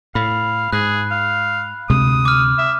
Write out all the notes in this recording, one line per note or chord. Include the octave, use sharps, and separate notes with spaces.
A2 F5 B5
G#2 G#4 F#6
F5
D2 C3 G#3 D#6
D6 F6
E5